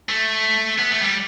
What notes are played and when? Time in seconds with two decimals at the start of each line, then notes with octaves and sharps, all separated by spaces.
0.09 A3
0.78 B3
0.91 A3
1.02 G3